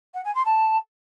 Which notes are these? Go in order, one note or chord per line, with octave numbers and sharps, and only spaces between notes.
F#5
G#5
C6
A5